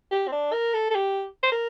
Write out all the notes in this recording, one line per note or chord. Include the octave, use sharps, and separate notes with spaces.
G4
C4
D4
A#4
A4
A4
G4
C5
A#4